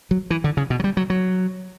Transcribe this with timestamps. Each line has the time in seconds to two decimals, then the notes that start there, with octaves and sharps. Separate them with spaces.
0.11 F#3
0.30 E3
0.44 D3
0.57 C#3
0.70 B2
0.80 F#3
0.84 G3
0.97 F#3
1.10 F#3